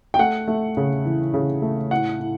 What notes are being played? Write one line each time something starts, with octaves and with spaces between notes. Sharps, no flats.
G5
A3 F#5
A3
C#3
E3
C#3
A3
A2 F#5
A2